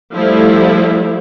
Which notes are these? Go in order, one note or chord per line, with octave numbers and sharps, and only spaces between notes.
F3 G3 A3 E4